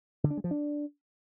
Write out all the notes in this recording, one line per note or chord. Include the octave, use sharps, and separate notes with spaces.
D3
D4
G#3
F3
D4